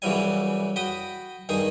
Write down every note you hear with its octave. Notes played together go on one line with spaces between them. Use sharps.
C2 C#3 E3 F#3 G3 G#5
F#4 G5 B5 D#6
G2 D#3 G#4 G#5